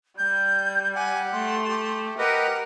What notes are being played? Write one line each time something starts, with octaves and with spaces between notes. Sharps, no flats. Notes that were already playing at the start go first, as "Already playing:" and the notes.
G3 G6
G4 F#5 G#5
A3 C6
G4
G4 A#4 B4 D#5 F#5